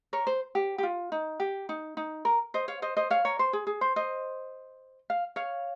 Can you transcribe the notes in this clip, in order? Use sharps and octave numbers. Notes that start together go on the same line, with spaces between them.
A#4 C#5
C5
G4
G4
F4
D#4
G4
D#4
D#4
A#4
C5 D#5
C#5 F5
C5 D#5
C5 D#5
C#5 F5
A#4 C#5
C5
G#4
G#4
C5
C5 D#5
F5
C#5 F5